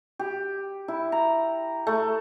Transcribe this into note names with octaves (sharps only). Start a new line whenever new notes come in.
G4
E4
A#5
A3